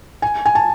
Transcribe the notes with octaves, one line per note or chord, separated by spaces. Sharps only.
G#5
G#5
A5